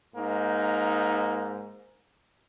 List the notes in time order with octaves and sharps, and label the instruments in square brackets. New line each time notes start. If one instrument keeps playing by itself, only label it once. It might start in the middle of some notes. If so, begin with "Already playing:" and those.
[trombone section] G#2 A#3 D#4